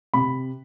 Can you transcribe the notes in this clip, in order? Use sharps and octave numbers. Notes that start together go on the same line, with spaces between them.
C3 B5